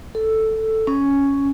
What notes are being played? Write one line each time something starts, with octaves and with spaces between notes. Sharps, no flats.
A4
C#4